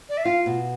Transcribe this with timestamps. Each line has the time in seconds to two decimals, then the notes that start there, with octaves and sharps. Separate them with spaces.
0.09 D5
0.17 E5
0.24 F4 F5
0.46 B2